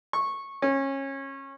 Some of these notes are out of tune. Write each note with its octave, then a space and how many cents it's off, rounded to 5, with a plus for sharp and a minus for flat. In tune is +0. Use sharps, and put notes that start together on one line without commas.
C#6 -15
C#4 -25